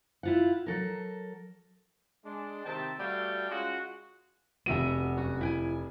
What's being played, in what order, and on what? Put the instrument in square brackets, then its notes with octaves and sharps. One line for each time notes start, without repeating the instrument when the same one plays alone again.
[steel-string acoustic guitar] E4 F4 F#5
F#3 A4 A#4
[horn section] G#3 D4
C3 D#3 C4 E5 G5 A5
G3 A3 F#4 F5 G5
G#3 C#4 F4 F#4
[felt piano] F1 D#7 [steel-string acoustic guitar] B3 F#4 E5
[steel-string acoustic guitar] F#2 F#4
E4 G5 G#5